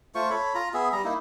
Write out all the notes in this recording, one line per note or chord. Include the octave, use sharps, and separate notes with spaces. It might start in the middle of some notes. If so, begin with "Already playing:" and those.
A3 F4 C5 C#6
A4 C#5 B5
F4 A#5
B3 G#4 E5
G3 A#5
A#3 D#4 E4